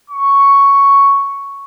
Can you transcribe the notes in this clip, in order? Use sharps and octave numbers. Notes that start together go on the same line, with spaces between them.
C#6